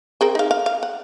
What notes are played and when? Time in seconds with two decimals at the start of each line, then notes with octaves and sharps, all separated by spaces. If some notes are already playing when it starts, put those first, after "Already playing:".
0.21 C4 G#4 A#4
0.35 D#4 F5
0.51 F5
0.66 F5
0.83 F#5